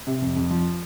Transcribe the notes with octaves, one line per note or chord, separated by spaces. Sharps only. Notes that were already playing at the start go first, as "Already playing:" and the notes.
C3
F2
F2
F3